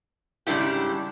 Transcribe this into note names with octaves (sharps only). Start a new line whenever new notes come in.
G#2 C#3 G3 D4 E4 G4